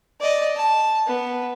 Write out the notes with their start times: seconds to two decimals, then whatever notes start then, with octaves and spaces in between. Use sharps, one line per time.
0.21 D5 D#5
0.56 A5
1.07 B3